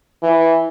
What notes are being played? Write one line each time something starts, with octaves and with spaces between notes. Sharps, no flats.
E3